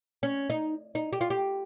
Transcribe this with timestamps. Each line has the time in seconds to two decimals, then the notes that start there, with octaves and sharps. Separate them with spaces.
0.23 C#4
0.50 D#4
0.95 D#4
1.13 G4
1.21 F4
1.30 G4